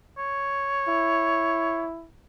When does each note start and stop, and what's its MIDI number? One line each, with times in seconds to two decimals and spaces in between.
0.18 1.84 73
0.88 2.08 64